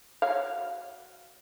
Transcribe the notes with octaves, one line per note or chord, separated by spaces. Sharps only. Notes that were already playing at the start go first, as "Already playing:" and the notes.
F#3 C#5 F5